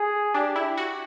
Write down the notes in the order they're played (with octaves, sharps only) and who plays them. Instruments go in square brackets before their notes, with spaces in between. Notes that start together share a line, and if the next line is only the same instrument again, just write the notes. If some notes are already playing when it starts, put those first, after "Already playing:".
Already playing: [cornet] G#4
[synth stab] D4 [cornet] G4
[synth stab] E4
F#4